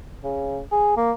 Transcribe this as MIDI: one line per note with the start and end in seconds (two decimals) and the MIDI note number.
0.24 0.59 49
0.72 0.92 68
0.97 1.12 58